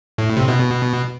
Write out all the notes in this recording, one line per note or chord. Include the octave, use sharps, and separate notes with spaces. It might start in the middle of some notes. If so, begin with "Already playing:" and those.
A2
C3
B2